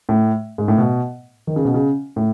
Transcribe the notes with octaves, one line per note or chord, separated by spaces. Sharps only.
A2
G#2
A2
B2
D#3
C#3
B2
C#3
A2